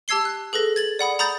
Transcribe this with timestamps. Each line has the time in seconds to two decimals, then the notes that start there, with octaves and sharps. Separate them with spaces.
0.08 G4 A5 E6 G#6 C7 G7
0.25 F#6
0.53 G#4 A4 B4 A#6
0.76 G#6 A6 F#7
0.99 D5 F#5 B5 D#6
1.19 A#5 B5 D#6 G6 A6